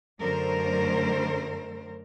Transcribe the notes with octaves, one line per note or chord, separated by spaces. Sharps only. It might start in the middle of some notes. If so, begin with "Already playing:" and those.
F#2 D3 A3 A#4 C5